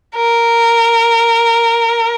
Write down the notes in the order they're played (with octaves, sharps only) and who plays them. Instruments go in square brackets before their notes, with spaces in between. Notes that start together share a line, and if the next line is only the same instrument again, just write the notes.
[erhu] A#4